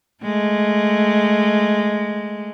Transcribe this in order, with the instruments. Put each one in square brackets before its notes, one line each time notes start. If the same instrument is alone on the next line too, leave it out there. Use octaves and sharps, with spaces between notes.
[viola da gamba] G#3 A3